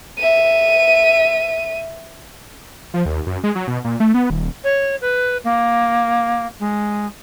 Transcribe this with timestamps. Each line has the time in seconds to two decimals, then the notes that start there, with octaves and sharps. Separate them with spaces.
0.18 E5 D#7
2.94 F3
3.06 D#2
3.27 F#2
3.44 G#3
3.55 F#3
3.67 B2
3.84 A#2
4.00 A3
4.14 B3
4.30 D#1
4.64 C#5
5.01 B4
5.44 A#3
6.60 G#3